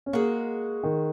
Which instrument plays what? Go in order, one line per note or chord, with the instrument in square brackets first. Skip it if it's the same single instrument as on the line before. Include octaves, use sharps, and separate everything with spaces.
[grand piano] C#4
[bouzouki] G#3 F#4 [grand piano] A#3
[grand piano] D#3